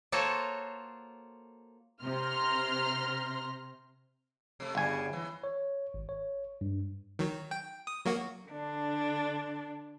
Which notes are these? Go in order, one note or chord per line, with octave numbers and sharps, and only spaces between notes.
A#3 F4 F#4 A4 C5 C#5
C3 A#5 C6 F6
C3 A3
G1 C#3 G3 G#5
E3
C#5
G#1
C#5
G2
D#3 F#3
G5
D#6
F#3 A#3 F#4
D3 D4